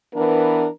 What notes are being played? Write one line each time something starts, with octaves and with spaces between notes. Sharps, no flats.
E3 B3 D4 A#4